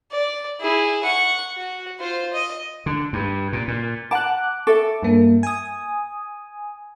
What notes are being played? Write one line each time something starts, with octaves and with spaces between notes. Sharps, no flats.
D5
E4 G#4
F#5 C#6
F#4
F4 C5
D#5
D3
G2
A#2
A#2
F#5 A5 A#5 D6 F#6
A4 E5 C#6 D6
G2 A#3
G#5 D#6